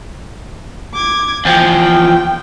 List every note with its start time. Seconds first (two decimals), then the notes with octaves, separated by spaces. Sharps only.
0.94 D6 G#6
1.45 E2 F3 G5